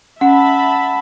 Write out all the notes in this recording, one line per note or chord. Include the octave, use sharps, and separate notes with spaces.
C#4 E5 F#5 A5 B5